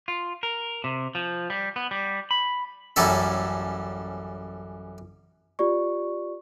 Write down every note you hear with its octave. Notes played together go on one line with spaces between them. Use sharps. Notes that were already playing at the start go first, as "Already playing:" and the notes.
F4
A#4
C3
F3
G3
B3
G3
B5
A1 F#2 G3 C#4 A4 E5
F4 G4 D5 C#6